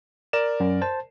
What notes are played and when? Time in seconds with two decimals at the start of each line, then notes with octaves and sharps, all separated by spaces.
0.33 A#4 D5 E7
0.60 F#2
0.82 C5 A5